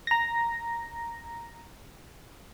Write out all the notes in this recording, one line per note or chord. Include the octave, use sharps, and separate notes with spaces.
A#5 A#6